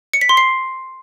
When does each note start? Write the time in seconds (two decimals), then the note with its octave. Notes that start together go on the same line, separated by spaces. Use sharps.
0.13 C#7
0.21 B6
0.29 C6
0.37 C7